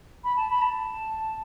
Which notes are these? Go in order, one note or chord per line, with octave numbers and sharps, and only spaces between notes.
B5
A5
B5
A5